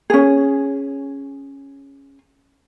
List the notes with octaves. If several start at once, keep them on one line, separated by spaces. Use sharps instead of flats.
C#4 G#4